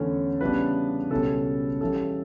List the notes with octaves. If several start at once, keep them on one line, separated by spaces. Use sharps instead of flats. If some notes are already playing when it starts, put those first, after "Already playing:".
Already playing: E2 D3 A3 C#4 E4
C#3 E3 G3 B3 D4 B4
C#2 B2 G3 C#4 E4 A4
C#3 E3 G3 A4